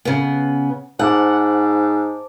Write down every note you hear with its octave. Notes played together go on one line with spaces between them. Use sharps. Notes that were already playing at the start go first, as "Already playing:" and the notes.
C#3 B3
G#2 C5 F#5 A5 D6